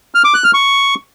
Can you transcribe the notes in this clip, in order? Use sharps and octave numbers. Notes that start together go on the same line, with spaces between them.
F6
D6
F#6
F6
C#6